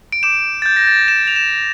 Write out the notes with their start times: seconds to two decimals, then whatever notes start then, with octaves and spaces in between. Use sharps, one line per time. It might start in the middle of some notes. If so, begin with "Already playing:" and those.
0.12 D7
0.23 D6 G6 E7
0.62 A6
0.66 G6
0.76 A#6
0.87 A6
1.08 E7
1.27 F7
1.36 E7